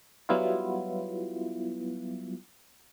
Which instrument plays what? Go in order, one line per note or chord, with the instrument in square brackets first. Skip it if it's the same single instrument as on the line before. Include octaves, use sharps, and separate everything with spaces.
[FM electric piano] F#3 G3 B3 E4 F4